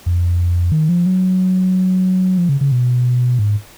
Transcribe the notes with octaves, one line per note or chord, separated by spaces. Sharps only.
F2
D#3
F3
F#3
F3
C#3
C#3
B2
G#2